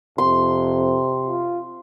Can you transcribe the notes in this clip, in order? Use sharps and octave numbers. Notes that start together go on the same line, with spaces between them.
F2 C3 C6
F4